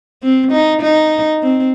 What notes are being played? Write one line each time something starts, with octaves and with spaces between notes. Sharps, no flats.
C4
D#4
D#4
C4